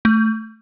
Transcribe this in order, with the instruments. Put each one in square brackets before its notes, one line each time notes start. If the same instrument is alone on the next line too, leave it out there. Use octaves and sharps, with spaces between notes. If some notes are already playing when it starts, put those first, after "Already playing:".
[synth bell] A3